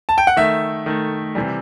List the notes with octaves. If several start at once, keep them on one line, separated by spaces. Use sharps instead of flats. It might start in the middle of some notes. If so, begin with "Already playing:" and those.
A5
G5
F#5
D#3 A3 E5
D#3 A3
C3 E3 G3